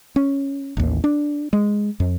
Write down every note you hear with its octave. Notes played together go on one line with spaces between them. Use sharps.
C#4
A1 D#2
D4
G#3
F2